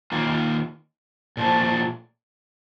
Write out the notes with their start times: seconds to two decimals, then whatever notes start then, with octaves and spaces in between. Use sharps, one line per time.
0.12 D#3 A#3 F4
1.37 A#2 F3 A3